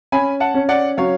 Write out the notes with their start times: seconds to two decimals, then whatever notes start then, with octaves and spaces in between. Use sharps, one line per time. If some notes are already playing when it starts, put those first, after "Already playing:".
0.12 C#4 G#5 B5
0.40 F#5 A5
0.54 C#4
0.69 D5 F#5
0.97 F#3 C#5 F5